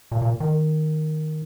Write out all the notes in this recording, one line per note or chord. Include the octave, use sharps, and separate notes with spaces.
A#2
A#2
D#3